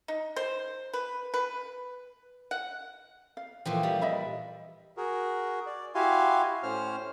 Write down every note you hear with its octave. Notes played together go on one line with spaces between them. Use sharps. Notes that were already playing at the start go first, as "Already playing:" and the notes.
D#4
C5
B4
B4
F#5
F5
A#2 E3 F3 G5
G3
D#5 E5 B5
F#4 G#4 A#4
D5
E4 F#4 G4 F5 G#5 C6
A2 C#4 C5 F6